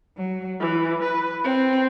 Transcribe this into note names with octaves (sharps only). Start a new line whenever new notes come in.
F#3
E3
B4
C4